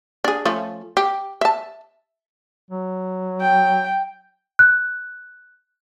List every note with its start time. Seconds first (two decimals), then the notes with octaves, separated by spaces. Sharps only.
0.24 D4 G#4
0.45 F3 A3 C#4
0.97 G4
1.41 E5 A5
2.71 F#3
3.41 G5
4.59 F#6